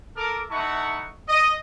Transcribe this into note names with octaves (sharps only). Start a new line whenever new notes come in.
A4 A#4 D6
A3 D#4 E4 F#5 A5 C#6
D#5